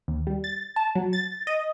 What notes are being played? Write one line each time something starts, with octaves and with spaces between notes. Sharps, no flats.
D#2
G3
A6
A5
F#3
A6
D#5